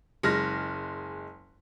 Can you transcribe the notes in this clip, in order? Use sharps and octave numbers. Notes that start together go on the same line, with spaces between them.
F#1 G#3 F6 A#6